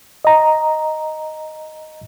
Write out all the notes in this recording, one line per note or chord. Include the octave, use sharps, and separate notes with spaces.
D#5 A#5